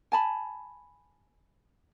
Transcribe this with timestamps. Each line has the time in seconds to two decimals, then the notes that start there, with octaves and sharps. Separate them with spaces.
0.12 G#5 A5 B5